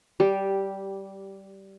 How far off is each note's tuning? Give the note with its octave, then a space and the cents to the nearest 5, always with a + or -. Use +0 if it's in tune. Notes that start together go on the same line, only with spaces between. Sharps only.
G3 -15 G4 +0